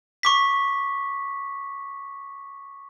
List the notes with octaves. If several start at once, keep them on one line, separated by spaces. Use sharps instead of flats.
C#6 D6 B6